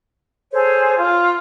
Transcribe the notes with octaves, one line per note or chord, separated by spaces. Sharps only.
G#4 A4 C5 C#5
F4